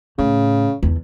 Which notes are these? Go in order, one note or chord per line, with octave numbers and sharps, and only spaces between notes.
A2 C#3
E2 D3